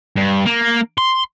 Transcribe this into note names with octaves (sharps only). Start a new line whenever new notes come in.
G2
A#3
C6